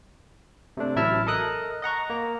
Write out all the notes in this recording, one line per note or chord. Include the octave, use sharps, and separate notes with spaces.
C3 A3 D4
A1 F#3 E4 E5 A5 F6
A4 A#4 D#5 D#6 F#6
D#5 F#5 A#5 C#6
A#3 A#5